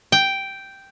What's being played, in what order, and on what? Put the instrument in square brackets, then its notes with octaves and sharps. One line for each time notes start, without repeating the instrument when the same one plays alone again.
[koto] G5